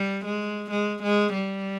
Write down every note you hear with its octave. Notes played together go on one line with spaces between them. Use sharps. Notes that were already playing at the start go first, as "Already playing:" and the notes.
Already playing: G3
G#3
G#3
G#3
G3